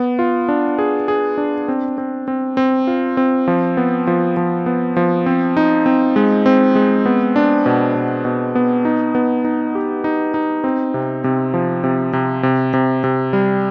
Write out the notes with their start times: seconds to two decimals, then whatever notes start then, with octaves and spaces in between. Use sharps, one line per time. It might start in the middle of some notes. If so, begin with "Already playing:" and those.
Already playing: B3
0.19 F4
0.49 D4
0.78 G#4
1.08 G#4
1.38 D4
1.68 C4
1.98 C4
2.28 C4
2.57 C4
2.87 F4
3.17 C4
3.48 F3
3.77 B3
4.07 F3
4.37 F3
4.66 B3
4.97 F3
5.26 C4
5.57 D#4
5.86 C4
6.16 G#3
6.46 C4
6.75 G#3
7.06 B3
7.36 D4
7.66 B2
7.95 B2
8.25 B2
8.55 B3
8.85 D#4
9.15 B3
9.45 D#4
9.75 G4
10.04 D#4
10.34 D#4
10.64 C4
10.94 C3
11.24 C3
11.54 F3
11.84 C3
12.13 C3
12.43 C3
12.74 C3
13.04 C3
13.33 G3